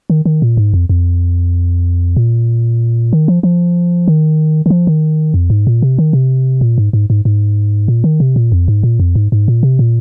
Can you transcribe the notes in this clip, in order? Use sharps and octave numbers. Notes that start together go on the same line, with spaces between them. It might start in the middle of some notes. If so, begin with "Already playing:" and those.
D#3
D#3
A#2
G#2
F2
F2
A#2
D#3
F3
F3
D#3
D#3
F3
D#3
F2
G#2
A#2
C3
D#3
C3
A#2
G#2
G#2
G#2
G#2
A#2
D#3
C3
A#2
F2
G#2
A#2
F2
G#2
G#2
A#2
C3
A#2